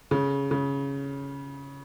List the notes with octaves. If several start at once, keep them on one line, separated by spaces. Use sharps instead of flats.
C#3
C#3